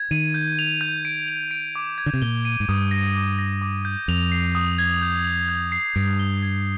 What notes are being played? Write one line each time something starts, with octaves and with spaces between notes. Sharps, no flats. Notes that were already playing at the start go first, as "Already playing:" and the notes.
Already playing: G#6
D#3 D#7
G6
F7
G6
D7
F7
D7
D6
G#6
D3
C3
A#2 G7
D#7
G#2
G2 D#6
A#6
D6
A#6
D6
G6
F2 F7
C7
D#6
G#6
G6
F7
G6
C7
G2 G#6
G7
G#6